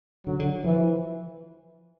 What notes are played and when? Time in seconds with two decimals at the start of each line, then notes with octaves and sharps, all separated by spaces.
0.26 D3 F#3
0.39 D3
0.64 E3 F3